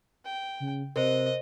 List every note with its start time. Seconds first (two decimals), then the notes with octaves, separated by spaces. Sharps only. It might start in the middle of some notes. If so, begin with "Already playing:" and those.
0.25 G5
0.60 C#3
0.96 C3 A#4 C5 D#5